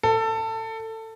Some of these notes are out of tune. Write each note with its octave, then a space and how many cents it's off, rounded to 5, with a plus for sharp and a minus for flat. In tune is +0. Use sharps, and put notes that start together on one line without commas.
A4 +20